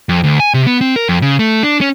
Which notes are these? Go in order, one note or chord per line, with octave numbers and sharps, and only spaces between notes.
F2
D2
G#5
C3
B3
C4
A#4
F2
C#3
A3
D4
C#4